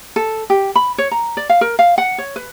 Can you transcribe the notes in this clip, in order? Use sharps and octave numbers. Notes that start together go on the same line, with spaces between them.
A4
G4
B5
C#5
A#5
D5
F5
A#4
F5
F#5
C#5
B4